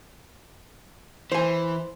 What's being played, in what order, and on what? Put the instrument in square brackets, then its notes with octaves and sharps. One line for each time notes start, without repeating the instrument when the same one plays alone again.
[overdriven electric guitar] E3 [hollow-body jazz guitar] C5 G#5